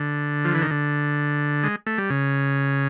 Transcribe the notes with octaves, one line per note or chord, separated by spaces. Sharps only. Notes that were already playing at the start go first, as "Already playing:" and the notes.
Already playing: D3
F3
E3
D#3
D3
G#3
A3
G3
C#3